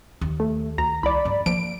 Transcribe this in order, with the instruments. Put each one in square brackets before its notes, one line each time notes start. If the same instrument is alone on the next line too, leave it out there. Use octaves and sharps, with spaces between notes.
[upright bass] D#2
[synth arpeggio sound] A3
[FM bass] D2 [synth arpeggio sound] A#5
[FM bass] C2 [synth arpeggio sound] D5 B5
[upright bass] G2
[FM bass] F3 [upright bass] A#3 [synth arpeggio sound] D7